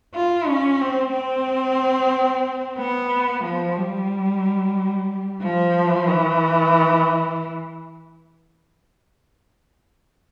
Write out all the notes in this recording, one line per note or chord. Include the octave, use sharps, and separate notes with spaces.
F4
C#4
C4
C4
B3
F3
G3
F3
E3